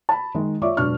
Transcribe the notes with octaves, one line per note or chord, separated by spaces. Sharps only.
A5 B5
D#3 G#3
F4 C#5 D5 E5 C#6 D6
E1 F#3 D4 C#6 F6